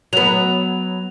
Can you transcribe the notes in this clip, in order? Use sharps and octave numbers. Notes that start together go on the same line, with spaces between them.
F#3 B3 F7